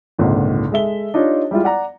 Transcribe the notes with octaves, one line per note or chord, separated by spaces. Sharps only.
G#1 C#2 A#2 D3
G#3 A4 E5 G7
D4 D#4 F4 G4 C#5
G3 G#3 E4 F4
D5 F#5 A#5